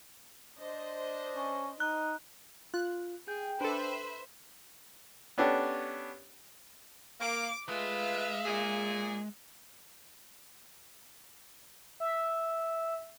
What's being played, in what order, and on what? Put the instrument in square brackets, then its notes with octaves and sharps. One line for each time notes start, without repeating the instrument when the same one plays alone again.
[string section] D4 C5 D#5
[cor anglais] C#4
[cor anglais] D#4 [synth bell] F#6
[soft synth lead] F4 [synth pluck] F#6
[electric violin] G#4 [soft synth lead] G5
[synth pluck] D4 A4 [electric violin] B4 B5 [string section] C5 E5
[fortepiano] B3 C#4 D4 G4 A4
[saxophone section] A#3 [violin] D6
[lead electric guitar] G#3 [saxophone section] A3 F4 B4 [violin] E5 F5
[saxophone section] A#2 G#4
[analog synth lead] E5